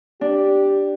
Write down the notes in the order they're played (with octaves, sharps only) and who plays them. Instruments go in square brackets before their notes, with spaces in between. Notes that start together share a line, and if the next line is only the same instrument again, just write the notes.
[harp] D4 [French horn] G4